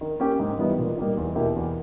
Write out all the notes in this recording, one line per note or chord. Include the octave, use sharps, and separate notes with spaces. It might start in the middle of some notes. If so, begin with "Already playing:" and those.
D#3
A#3 C#4 G4
G#2
E3 G3 B3 D#4
A#2
G3 A#3 D#4 G4
E2
B2 A#3 E4 G4
E2